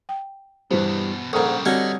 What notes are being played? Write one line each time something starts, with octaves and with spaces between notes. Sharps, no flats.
G5
E2 G2 B2 E3 G3 C5
A#1 G#2 G3 C#4 A4 A#4 A#5 D#6
D3 G3 C4 C#4 D#4 F#4 B4 D#5